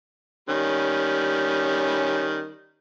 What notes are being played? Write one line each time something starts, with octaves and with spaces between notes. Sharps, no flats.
D#3 G3 C#4